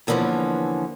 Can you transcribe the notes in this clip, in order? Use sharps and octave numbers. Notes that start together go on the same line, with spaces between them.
E2 D3 E3 F3 A#3 C#4